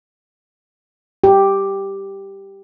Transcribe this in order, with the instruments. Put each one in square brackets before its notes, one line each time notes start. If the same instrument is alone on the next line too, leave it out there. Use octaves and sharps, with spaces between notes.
[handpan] G4